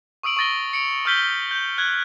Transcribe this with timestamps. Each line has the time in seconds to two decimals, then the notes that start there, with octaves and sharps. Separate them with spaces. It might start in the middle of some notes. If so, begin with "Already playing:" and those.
0.23 C#6 D#6 E6 D7 F#7
0.37 C#6 D#6 A6 A#6 G7
0.73 C#7 D7 F7
1.05 C#6 E6 F6 G6 B6 G7
1.51 G6
1.78 F#6 G#6